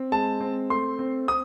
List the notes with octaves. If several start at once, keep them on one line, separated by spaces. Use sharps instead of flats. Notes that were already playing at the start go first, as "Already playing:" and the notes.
Already playing: C4
G#3 A5
C4
A3 C6
C4
C4 D#6